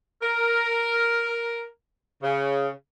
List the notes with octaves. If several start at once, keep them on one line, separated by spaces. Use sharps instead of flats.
A#4
C#3